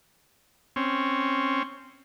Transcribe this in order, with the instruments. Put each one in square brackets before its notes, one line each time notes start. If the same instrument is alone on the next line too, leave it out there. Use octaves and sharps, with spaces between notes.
[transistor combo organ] C4 C#4